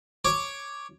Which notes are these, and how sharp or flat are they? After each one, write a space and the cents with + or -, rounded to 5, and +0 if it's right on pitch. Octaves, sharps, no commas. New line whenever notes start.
C#5 +0 D6 +0